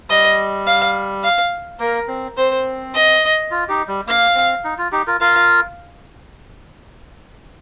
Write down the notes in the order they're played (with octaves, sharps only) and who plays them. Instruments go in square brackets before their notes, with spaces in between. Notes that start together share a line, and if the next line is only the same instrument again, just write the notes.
[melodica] G3 [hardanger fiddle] D#5
[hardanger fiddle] F5
F5
[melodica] A#3 [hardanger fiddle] A#4
[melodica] C4
[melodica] C4 [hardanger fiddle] C5
[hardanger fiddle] D#5
[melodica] F4
D#4 G4
G3
[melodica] A#3 [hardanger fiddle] F5
[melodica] C4
D#4
F4
D#4 G4
F4 A#4
[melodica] F4 A#4 [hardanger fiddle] F5